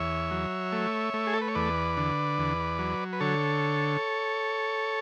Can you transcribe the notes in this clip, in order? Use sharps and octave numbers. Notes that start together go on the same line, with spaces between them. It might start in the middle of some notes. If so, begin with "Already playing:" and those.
Already playing: E2 C#5 E5
F#3
A3
A3
G#4
A4
B4
C#5
E2 B4 D5
D3
E2
F#3
B4
D3 A4 C#5